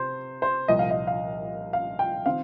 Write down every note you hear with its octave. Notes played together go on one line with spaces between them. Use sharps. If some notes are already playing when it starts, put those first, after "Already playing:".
Already playing: C3 C5
C5
C2 A#2 F3 D#5
F5
D#5
F5
F5
G5
D#3 C4 F5